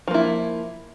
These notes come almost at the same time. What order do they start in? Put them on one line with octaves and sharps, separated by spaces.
F3 A#3 E4